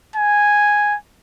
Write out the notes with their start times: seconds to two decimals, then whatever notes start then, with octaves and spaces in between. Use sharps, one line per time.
0.16 G#5